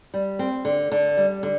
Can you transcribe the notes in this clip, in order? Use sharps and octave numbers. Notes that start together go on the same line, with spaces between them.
G3
C4
D3
D3
G3
D3